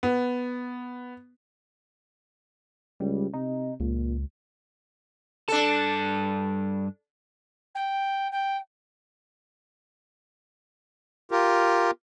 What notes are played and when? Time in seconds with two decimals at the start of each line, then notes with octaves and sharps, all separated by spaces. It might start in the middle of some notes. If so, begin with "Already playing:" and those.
0.03 B3
3.00 C#2 G3
3.33 C3 D#4
3.80 C#2 A#2
5.48 G2 D4 A4 A5
7.75 G5
8.32 G5
11.31 F4 G4 A#4